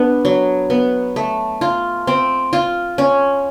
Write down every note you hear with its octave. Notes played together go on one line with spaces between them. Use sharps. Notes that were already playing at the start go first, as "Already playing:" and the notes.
Already playing: B3 D4
F#3
B3
A3
F4
C4
F4
C#4